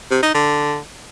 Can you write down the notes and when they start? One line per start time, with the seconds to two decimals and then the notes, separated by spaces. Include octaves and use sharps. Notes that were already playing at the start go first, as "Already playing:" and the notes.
0.11 C3
0.23 D#4
0.35 D3